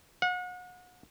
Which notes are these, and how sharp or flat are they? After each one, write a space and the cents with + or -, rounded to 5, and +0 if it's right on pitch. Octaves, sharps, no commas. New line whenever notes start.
F#5 -35